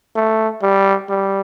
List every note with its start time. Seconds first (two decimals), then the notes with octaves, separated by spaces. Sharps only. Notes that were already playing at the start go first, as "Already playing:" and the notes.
0.15 A3
0.63 G3
1.09 G3